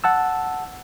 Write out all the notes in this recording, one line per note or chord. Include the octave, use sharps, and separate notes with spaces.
F#5 A5 E6